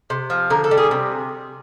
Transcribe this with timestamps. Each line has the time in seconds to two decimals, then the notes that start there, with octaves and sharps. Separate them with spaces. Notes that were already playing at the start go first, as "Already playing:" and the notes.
0.10 C3
0.30 F3
0.50 D3 A#4
0.64 A4
0.71 G3
0.78 G#4
0.91 C3